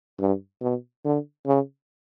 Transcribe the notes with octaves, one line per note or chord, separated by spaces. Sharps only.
G2
B2
D3
C#3